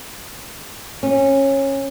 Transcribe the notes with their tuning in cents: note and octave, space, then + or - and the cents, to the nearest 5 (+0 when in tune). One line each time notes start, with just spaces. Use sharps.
C#4 -20